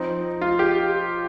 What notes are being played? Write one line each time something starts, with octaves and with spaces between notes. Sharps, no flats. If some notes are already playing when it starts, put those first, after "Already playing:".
Already playing: F3 C4 D#4
F4
G4